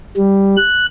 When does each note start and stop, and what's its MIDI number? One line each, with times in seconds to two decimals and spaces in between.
0.17 0.56 55
0.57 0.86 90